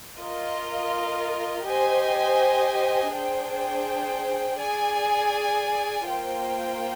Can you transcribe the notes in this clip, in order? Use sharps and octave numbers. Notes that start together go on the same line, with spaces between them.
F4 A#4 D#5
G4 C5 D#5 G#5
D4 G#4 C5 G5
G#4 D5 G#5
A#3 F4 C5 G5